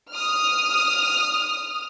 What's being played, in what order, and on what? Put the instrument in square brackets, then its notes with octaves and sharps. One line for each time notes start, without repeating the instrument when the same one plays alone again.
[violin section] D#6 F6